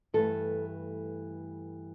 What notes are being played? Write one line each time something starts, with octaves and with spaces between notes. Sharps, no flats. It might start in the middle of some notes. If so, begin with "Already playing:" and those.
G2 E3 A3 A4